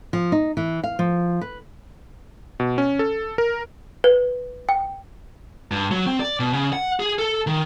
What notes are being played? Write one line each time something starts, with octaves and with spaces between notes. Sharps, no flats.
F3
D#4
E3
F5
F3
B4
B2
C#4
A4
A#4
B4
G5
G2
F#3
C4
D5
B2
C#3
F#5
G#4
A4
D#3